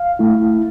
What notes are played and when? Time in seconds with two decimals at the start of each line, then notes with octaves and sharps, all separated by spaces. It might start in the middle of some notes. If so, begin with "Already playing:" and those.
Already playing: F5
0.19 A3 E4